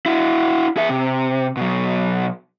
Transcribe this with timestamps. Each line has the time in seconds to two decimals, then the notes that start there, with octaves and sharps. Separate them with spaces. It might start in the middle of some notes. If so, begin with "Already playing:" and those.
0.06 E4 F#4
0.77 G#4 E5
0.90 C3
1.57 B2 F#3